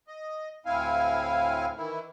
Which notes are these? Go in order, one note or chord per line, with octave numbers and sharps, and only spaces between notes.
D#5
D2 A2 C4 E4 F5 G#5
D#3 E3 E4